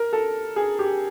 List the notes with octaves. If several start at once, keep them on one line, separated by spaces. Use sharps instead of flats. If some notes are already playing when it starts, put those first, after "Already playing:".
Already playing: A#4
A4
G#4
G4